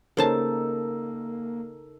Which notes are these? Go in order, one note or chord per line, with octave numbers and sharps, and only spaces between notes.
C#3 A#3 D#4 A4 A#4 C5 A5